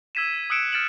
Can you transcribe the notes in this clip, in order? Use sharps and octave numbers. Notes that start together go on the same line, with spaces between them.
E6 G#6 B6 D#7 E7
D#6 E6 F#6 C#7 D7 E7
F6 A6 C#7 D7 E7 F#7